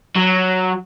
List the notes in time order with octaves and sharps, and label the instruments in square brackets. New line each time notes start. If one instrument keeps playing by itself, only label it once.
[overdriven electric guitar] F#3